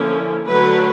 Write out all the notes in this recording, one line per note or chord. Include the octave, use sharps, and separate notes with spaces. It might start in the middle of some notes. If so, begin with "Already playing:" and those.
Already playing: D3 F3 A#3 C#4 E4
D3 F#3 A3 B4